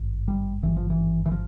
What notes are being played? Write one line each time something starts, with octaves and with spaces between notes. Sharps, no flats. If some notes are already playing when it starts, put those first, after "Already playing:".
Already playing: G#1 G2
G3
G#1 G2 E3
F3
E3
E3
F3